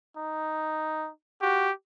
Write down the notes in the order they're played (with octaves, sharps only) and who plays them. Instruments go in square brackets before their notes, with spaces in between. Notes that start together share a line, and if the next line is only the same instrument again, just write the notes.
[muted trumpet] D#4
[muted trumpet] F#4 [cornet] G4